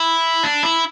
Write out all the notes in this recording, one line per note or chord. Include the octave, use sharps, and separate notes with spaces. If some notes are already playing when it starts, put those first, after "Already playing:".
Already playing: E4
D4
E4